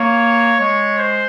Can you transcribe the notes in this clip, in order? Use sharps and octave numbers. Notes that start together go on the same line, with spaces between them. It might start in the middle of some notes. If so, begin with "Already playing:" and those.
Already playing: A#3 C#5
G#3 C#5
C5